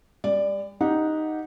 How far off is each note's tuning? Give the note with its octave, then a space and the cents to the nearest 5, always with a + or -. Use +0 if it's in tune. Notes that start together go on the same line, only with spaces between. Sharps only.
G3 +45 D5 +0
D#4 +0 G4 +0 F#5 -15